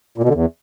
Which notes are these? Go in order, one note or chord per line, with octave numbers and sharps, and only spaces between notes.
A#2
B2
D3
E2